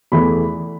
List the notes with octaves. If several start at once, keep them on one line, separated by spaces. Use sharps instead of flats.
E2 E3 A3 B5